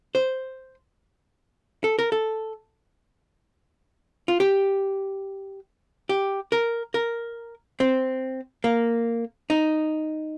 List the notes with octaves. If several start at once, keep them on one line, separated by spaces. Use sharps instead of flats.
C5
A4
A#4
A4
F4
G4
G4
A#4
A#4
C4
A#3
D#4